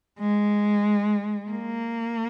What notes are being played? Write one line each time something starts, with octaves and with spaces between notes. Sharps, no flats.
G#3
A#3